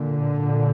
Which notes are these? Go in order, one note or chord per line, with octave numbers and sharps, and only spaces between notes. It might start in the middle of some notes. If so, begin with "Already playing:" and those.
Already playing: A#2 D3
A#2